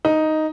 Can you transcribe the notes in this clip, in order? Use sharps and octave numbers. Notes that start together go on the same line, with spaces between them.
D#4